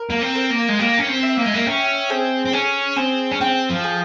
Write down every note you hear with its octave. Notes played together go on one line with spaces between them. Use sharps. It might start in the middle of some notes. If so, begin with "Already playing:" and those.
Already playing: A#4
A#3
C4
A#4
A#3
G#3
A#3 G4
C#4
C4
E5
A#3
G#3
A#3
C#4 G5
C4 G#4
C4
C#4 G#4
C4 G#4
C#4
C4 G5
F3
G#4